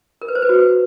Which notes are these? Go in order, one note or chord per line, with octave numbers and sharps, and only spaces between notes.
A#4
B4
C5
B4
F#4